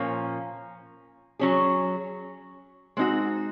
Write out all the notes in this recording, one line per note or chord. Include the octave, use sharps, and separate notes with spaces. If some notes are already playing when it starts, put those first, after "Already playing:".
Already playing: A#2 F3 A#3 C#4
F#3 C#4 G#4
G#3 C4 D#4 F#4